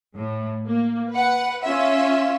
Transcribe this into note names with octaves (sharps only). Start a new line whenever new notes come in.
A2
A#3
B4 F#5
C#4 F4 E5